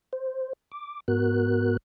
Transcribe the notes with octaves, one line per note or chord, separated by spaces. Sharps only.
C5
D6
G#2 B3 F#4 A#4 F#6